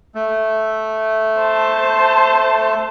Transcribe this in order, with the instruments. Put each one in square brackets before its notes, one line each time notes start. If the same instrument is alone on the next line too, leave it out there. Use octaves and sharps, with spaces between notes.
[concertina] A3
[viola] C5 A5